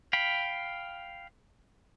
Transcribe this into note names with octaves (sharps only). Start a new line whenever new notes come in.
F5 G5 B5